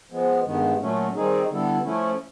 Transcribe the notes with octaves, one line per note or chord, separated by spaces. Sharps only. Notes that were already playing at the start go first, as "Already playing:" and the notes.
F3 G#3 B3
G2 D#3 G#3 B3
A#2 F#3 A3 C#4
D#3 G3 C4 D#4 G#4
D3 G3 B3 E4 A4
F3 A3 C#4 E4